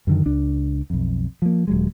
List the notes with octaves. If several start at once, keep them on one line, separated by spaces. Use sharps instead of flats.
F#2 D3 D#3
C#2 D4
B1 F2
F3 A#3
D#1 F#3 G#3